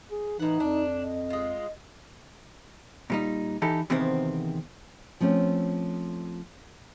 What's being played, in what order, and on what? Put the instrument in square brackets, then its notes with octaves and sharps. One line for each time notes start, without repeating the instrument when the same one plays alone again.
[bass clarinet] G#4
[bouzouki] A2 F#5 [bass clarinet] E3 [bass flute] D#4
[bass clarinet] F2 [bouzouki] D4
[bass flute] D#5
[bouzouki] G#3 F4
[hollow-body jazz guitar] A#2 G3 D#4
E3 D#4 G4 A4
E2 C3 D#3 B3 C4
[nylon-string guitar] F3 A3 C4 C#4